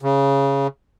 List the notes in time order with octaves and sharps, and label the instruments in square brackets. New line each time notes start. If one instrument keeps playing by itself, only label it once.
[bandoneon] C#3